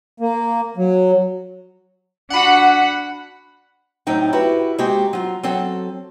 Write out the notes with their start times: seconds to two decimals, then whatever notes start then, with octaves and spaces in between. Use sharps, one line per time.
0.20 A#3
0.77 F#3
2.30 D4 F#4 F#5 B5
4.07 A2 F#3 C4 D#4 G5
4.33 E4 F#4 G4 B4
4.78 G#3 A#3 C4 F#4 G4
5.13 F#3 F4
5.43 F#3 C4 A4